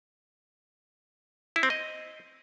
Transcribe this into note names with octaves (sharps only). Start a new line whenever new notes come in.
E4
C4
D#5